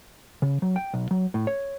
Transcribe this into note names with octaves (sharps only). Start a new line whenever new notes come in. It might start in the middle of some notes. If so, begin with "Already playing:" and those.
C#3
F#3
G5
B1
F#3
A2
C#5